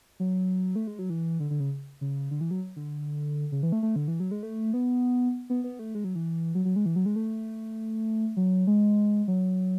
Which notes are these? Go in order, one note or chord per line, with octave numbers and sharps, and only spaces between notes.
F#3
A3
G#3
F#3
E3
D3
D3
C#3
C#3
D3
E3
F#3
D3
C#3
E3
A3
A3
D3
E3
F#3
G#3
A3
B3
B3
B3
A3
G#3
F#3
E3
F#3
F#3
G#3
E3
F#3
G#3
A3
F#3
G#3
F#3